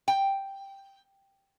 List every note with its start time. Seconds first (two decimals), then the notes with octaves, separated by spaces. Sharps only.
0.08 G5